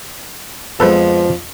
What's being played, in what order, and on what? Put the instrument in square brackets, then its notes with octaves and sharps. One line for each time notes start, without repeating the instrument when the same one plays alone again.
[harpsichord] F2 [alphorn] F3 [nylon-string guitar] G#3 B3 [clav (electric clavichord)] A4 B4 C5